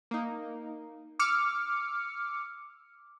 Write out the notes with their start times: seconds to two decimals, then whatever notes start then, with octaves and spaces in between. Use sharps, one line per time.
0.11 A#3 D#4
1.19 D6 E6 F6 C#7